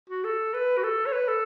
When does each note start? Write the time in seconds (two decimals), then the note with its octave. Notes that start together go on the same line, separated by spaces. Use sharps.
0.09 F#4
0.24 A4
0.54 B4
0.78 F#4
0.83 A4
1.06 C#5
1.13 B4
1.28 A4